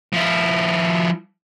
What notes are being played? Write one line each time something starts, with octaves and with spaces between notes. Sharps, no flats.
F3 E4